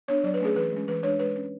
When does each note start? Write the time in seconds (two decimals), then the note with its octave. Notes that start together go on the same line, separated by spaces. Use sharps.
0.08 B3 D4 C#5
0.24 F#3 D5
0.34 B4
0.40 A3 C#4 G#4
0.56 E3 B4
0.72 G#3 C#4
0.88 E3 B4
1.03 G#3 D4 C#5
1.19 G#3 B4
1.36 C#4